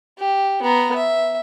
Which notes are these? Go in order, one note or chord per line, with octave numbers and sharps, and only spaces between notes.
G4
B3 A#5
E5